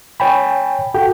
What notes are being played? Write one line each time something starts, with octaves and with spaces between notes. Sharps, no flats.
C#5 G5 G#5 B5
F#4 A4 G5